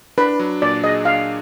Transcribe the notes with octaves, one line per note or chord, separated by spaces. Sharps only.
D4 B4
F#3
A#2 D5
G#4 D#5
D4 F5